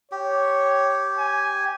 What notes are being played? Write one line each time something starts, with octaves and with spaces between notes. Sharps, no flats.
G4 C#5
G#5